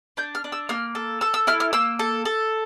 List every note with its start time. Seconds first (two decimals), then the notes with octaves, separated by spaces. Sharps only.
0.17 D4 G6
0.35 F6
0.44 D4
0.52 E6
0.69 A#3 F6
0.95 A4
1.21 A4 E6
1.34 E6
1.47 E4 F6
1.60 F6
1.73 A#3 E6
1.99 A4
2.25 A4